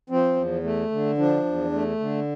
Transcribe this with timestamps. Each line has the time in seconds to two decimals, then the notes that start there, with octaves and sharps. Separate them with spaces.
0.10 F3 C4
0.36 E2
0.63 A3
0.91 D3
1.18 F3 D4
1.45 E2
1.72 A3
2.00 D3